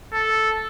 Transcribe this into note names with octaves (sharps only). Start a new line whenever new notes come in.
A4